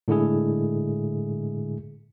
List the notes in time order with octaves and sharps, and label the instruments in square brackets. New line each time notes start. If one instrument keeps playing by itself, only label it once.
[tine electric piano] A2 D3 G#3 E4 G#4